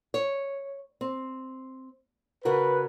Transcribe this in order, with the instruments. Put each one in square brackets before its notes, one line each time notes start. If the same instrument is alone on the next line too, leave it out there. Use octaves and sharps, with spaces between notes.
[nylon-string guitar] C#5
C4
[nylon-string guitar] C#3 F#4 A#4 [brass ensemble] B4